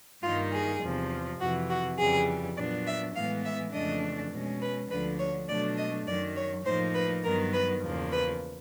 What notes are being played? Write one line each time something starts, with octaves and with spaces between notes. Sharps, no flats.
G2 D#3 G3 A#3 D#4 F4
G#4
E2 C3 F3
F2 C3 E3 F#4
F#4
F2 C#3 E3 G3 G#4
A#2 F#3 B3 D4 D5
E5
A2 E3 G#3 B3 F5
E5
F2 C#3 E3 A3 D4 D#5
B2 G#3 C#4
B4
D2 D3 F3 B4
C#5
B2 F#3 A3 D4 D5
D#5
F#2 D#3 F#3 D5
C#5
A2 F3 A#3 D#4 C5
B4
G2 D#3 F#3 B3 A#4
B4
E2 C#3 F3 A#3
B4